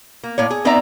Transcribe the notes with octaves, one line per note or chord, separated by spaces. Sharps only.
A#3
A2 A#3 C#5
G#4
B3 C4 D#4 D5 E5 A#5